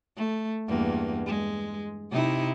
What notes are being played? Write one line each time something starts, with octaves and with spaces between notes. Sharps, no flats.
A3
E2 G2 A#3
G#3
C3 D#4 E4